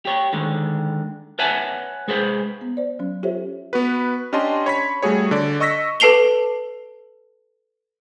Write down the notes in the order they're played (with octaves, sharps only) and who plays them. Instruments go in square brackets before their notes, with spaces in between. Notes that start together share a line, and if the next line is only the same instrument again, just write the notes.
[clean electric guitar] G4 C#5
D3 D#3 G#3
B4 C#5 E5 F#5 G#5 A5
G#3 G#4 A4 B4 C5
[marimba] B3
C5 D5
F#3 C#4
F4 G4 A4 C5 C#5 E5
[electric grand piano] B3 F#4 B4
C#4 D4 G4 D#5 A5 C6
C#5 B5 B6
G3 A3 F#4 G#4 C#5
D3 D5
D#5 C#6 E6 A#6 B6
[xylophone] A4 B4 A5 C7 F7 G7